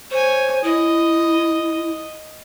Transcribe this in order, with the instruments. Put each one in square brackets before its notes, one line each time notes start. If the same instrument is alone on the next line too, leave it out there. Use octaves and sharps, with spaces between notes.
[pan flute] C5 [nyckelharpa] C#5 G#5
[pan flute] E4 [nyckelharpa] D#5